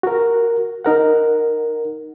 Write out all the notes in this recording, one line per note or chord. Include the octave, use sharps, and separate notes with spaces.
F#4 A#4
D#4 A#4 F#5